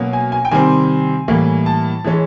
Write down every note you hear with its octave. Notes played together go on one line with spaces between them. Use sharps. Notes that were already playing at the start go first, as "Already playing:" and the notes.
Already playing: B2 F#3 A#3 C#4
G#5
G#5
G5
C3 D#3 G3 C4 G#5
A2 E3 G3 A#3
A5
E3 G#3 C#4